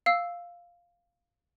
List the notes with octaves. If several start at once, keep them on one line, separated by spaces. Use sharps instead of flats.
F5 E6